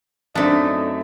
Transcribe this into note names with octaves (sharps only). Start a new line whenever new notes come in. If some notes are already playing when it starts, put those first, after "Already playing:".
F#2 A3 C4 D4 D#4 D#5 E5